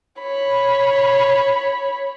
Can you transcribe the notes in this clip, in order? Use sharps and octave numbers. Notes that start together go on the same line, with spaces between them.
C#5 B5